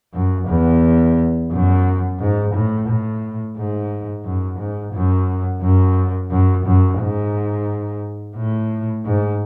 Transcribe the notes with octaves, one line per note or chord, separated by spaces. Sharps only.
F#2
E2
F#2
G#2
A2
A2
G#2
F#2
G#2
F#2
F#2
F#2
F#2
G#2
A2
G#2